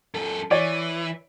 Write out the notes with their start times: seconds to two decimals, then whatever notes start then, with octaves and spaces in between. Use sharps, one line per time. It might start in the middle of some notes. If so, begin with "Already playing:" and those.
0.14 F#2 A4
0.51 E3 C#5 D5